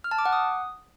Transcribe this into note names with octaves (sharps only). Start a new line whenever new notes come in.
F6
A5
D6
F#5
D#6